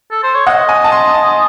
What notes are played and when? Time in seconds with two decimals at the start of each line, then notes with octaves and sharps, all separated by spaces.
0.11 A4
0.23 C5
0.35 C#5
0.47 D#5 F#5
0.69 G#5
0.84 A5
0.92 C6
1.14 A5